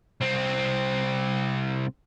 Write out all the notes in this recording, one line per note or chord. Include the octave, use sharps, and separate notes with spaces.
C2 C4